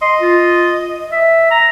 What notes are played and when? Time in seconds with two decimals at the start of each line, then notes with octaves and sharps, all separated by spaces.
0.02 D#5 C6
0.20 F4
1.12 E5
1.51 A#5